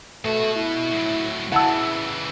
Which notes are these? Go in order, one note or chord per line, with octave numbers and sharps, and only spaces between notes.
B2 A3 F#4
E4
A2 F#3
C#3 E3 E4 F#5 A5 E6